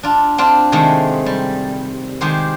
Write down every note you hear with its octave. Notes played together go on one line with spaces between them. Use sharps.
D4 F4
C4 D4 F4 C5
C3 D#3 G#3 A3 C4
G3
D#3 G#3 G4 C5